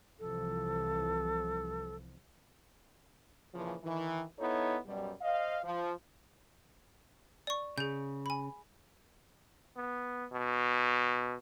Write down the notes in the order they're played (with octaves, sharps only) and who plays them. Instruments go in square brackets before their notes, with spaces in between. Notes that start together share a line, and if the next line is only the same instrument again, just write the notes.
[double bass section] C2 E3 F3 [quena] A4
[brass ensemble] A#2 C#3 E3 F3
D#3 E3
B3 D#4 E4 A4 C#5
F#2 B2 G3
C5 D#5 F5
F3
[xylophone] D5 C#6
[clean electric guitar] C#3 [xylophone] G#4 G6
[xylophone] G#5 B5
[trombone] B3
B2